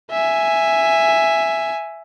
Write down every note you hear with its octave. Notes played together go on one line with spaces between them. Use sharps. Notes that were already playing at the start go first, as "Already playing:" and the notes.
E5 G#5